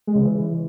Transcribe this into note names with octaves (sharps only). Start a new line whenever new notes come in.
G#3
C#3
E3